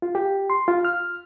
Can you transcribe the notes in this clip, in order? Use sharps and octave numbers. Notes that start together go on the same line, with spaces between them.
F4
G4
C6
F4
F6